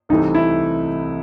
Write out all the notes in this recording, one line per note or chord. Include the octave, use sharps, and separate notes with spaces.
C2 C3 E3 A3 D#4
E4